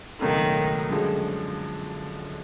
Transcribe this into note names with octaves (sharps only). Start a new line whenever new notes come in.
C#2 B2 D#3 F#3 A3
F#2 D3 F3 G#3